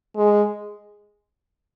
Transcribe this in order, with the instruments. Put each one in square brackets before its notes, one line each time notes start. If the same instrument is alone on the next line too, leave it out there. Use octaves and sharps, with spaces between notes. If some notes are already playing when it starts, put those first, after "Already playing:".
[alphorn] G#3